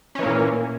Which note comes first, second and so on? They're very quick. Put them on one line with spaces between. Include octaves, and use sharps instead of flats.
C#4 E3 A#3 A#2